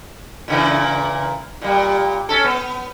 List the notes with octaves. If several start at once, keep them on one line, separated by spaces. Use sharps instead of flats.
A#2 C#3 E3
A#2 G3
C#4 A4
B3